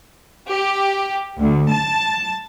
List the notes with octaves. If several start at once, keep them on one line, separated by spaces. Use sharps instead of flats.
G4
D2
A5